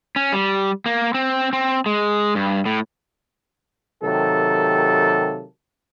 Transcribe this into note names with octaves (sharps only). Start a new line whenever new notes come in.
C#4
G3
A#3
C4
C4
G#3
G2
A2
C3 D#3 F#3 A#3 G4 A4